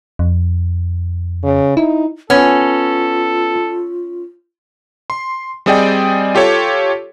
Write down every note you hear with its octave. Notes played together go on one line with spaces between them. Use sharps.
F2
C#3
D#4 E4
B3 C#4 F4 A4
C6
G3 C4 G#4 D5 D#5 G5
F4 G4 A4 C#5